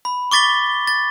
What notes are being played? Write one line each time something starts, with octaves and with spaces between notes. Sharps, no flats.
B5
C#6 D6 A6 B6 G7
A6